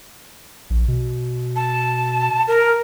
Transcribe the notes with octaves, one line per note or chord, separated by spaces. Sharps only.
A#1
B2
A5
A#4